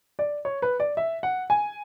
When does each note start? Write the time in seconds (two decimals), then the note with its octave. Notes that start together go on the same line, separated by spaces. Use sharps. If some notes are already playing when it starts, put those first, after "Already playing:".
0.19 D5
0.45 C#5
0.62 B4
0.80 D5
0.97 E5
1.23 F#5
1.50 G#5